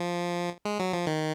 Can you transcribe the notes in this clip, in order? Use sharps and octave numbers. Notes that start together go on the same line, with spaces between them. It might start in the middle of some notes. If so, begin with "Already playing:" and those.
Already playing: F3
G#3
F#3
F3
D#3